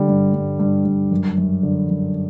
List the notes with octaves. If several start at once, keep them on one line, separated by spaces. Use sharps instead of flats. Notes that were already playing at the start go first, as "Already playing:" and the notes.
Already playing: D3 G3
G2
G2
G2
G2
F#2
F#2
D3
F#2